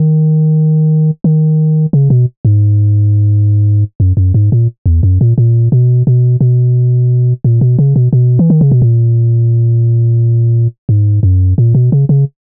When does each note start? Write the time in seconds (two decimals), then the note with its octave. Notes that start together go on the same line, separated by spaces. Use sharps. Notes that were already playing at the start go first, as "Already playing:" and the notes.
Already playing: D#3
1.24 D#3
1.93 C#3
2.10 B2
2.45 G#2
4.00 F#2
4.17 F#2
4.34 G#2
4.52 A#2
4.86 E2
5.03 F#2
5.21 A#2
5.38 A#2
5.72 B2
6.07 B2
6.41 B2
7.44 A#2
7.61 B2
7.79 C#3
7.96 B2
8.13 B2
8.39 E3
8.50 D#3
8.61 C#3
8.72 B2
8.82 A#2
10.89 G#2
11.23 F#2
11.58 A#2
11.75 B2
11.92 C#3
12.09 C#3